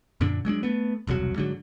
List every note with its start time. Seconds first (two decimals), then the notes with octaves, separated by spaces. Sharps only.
0.21 F#2 A#2 D3 D4
0.45 F#3 G#3 C#4 D4
0.63 A3 B3
1.07 E1 C2 C3 F#3
1.36 G#2 D3 F#3